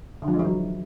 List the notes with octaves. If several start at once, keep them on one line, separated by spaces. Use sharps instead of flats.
D3
F3
G#3
E3
F#3